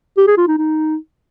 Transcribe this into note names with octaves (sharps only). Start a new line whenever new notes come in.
G4
G#4
F4
D#4
D#4